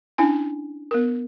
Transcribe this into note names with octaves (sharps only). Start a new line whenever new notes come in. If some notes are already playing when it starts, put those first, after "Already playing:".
C#4 D4 E4 G#5
B3 A#4